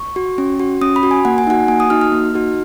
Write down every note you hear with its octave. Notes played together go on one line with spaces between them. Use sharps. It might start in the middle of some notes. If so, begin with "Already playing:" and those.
Already playing: C#6
F#4
C#4
F#4
C#4 D#6
B5
F#4
G#5
A#3 F#5
G#5
D#4 F#4 F#5
A#3 G#5
D#6
D#4 F#4 F6
F6
A#3
D#4 F#4